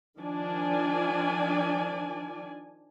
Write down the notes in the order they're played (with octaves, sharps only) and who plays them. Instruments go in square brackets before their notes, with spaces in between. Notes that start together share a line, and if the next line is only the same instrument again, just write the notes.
[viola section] D#3 F3 D4 D5 G#5